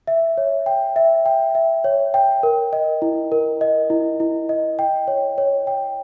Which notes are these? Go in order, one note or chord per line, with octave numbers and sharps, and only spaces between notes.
E5
C#5
G5
E5
G5
E5
C#5
G5
A#4
D#5
E4
A#4
D#5
E4
E4
D#5
G5
C#5
C#5
G5